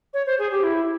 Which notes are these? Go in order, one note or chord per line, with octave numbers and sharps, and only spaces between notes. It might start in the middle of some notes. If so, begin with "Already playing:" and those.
C#5
C5
G#4
G4
E4